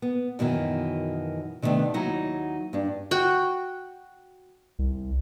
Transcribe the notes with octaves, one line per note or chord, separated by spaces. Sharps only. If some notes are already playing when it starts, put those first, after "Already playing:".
B3
F#2 B2 D#3 E3
C3 D#3 G3 A3 B3 D4
D#2 F#3 D#4 E4 F#5
G2 D4
F#4 G5
C2